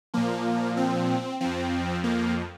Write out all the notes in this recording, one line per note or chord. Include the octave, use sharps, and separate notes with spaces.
A#2 F3 A#3
C4
F2 F3 C4
A#3